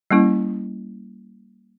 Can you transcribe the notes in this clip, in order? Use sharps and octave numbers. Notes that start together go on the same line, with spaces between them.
G3 A#3 C#4 E4